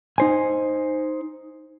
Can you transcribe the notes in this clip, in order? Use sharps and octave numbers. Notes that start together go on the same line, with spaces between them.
D#4 C5 G#5